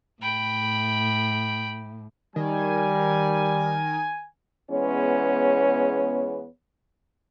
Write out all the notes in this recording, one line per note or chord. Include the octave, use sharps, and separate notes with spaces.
A2 G5 B5
D#3 G3 G#5
E2 G#3 B3 C#4 C#5